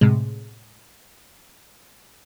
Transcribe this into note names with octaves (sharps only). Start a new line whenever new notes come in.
A2 C3 G#3